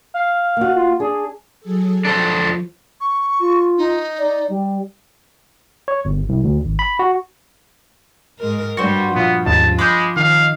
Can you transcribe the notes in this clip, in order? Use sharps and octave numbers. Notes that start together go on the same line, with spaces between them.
F5
A#3 F#4
F4
D4 G#4
F#3 G#4 A4
F3 D4 A4 C5
C#6
F4
D#4
D5
G3
C#5
G1
C2
D2
G#1
B5
F#4
G#2 G#3 A#4
G2 G3 F#4 C5
A#2 F3 B3 F4
D#2 G#2 C#3 A5
G#3 B5 D6 G6
D#3 D#4 F5